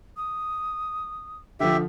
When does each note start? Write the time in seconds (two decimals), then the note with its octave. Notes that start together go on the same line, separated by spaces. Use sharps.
0.16 D#6
1.60 D3 F3 G4 E5